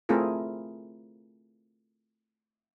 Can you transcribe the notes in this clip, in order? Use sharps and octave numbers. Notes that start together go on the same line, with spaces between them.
A3 C4 E4 F4 G#4 A#4